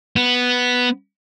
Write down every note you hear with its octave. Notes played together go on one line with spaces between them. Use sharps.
B3